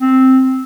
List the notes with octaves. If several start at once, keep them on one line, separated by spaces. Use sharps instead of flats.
C4